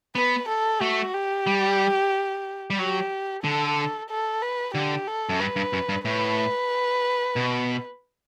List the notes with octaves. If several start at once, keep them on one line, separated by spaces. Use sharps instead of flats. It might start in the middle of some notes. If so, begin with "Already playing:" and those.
B3 B4
A4
A3 F#4
G4
G3
G3
F#3 G4
D3 A4
A4
B4
D3 G4
A4
F#2
G2 B4
G2
F#2
G2
A2 B4
B2